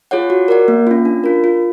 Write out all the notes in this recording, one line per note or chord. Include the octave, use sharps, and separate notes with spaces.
F4 G#4 C#5 F#5
F#4
A#4 D5 F#5
A#3
C#4 F4
D4
F4 A#4
F4